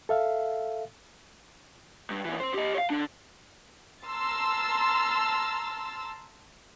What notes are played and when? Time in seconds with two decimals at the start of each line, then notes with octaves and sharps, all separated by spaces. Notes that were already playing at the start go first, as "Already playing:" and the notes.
0.09 A4 E5 F5
2.10 G2
2.25 D#2 E3
2.40 C4 C5
2.54 G4 D#5
2.74 C#5 F5
2.90 D3 D4
4.05 A5 A#5 C6 E6 F6 A6